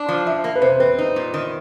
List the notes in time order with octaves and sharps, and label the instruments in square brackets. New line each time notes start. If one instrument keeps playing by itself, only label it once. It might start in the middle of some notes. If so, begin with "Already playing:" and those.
Already playing: [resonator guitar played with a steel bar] D4
F3
[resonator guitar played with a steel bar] F3 [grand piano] E5
[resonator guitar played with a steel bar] A#3
[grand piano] B4
[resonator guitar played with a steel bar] C3 [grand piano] C5
[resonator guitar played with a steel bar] C4 [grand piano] B4
[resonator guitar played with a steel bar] D#4
A#2
D#3